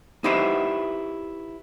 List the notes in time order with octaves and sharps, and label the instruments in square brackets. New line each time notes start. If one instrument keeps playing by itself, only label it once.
[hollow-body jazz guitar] D#4 E4 G4 B4 C5 E5